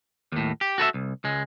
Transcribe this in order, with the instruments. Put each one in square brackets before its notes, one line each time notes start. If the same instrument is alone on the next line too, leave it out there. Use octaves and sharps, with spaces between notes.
[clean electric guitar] D#2 A2
G4
F#4 A4 B4 E5
C2
C#2 G#3